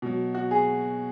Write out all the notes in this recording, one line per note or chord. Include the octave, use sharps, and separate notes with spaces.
B2 F#3
F#4
G#4